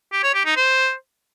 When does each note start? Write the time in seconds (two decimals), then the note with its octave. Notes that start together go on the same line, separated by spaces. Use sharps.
0.12 G4
0.23 C#5
0.34 G4
0.45 D#4
0.56 C5